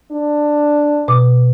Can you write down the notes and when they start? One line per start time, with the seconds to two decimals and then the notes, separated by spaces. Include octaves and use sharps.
0.11 D4
1.08 B2 D6